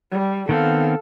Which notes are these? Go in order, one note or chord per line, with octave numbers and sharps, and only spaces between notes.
G3
D#3 B3 C4 A4 F5